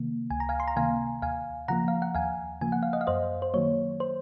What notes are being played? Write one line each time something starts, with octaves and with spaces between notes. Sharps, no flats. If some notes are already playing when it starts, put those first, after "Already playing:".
Already playing: C3 D#3 A#3
C#2 G#5
A#5
F5 G#5
C6
A#5
C3 D#3 A#3 F5 G#5
D#2 F5 G#5
C#3 F3 A#3 F#5 A#5
F5
F#5
D#2 F5 G#5
C#3 F3 A#3 G#5
F#5
F5
D#5 F#5
F5
F#2 C5 D#5
C5
D#3 F#3 A#3 C#5
C5